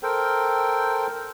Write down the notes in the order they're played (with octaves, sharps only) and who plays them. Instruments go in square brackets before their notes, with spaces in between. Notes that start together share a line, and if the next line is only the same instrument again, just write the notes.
[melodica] A4 A#4 C5 G5